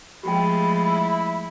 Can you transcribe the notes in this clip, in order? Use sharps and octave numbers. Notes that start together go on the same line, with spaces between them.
F3 G#3 A3 G4 G5 B5
E4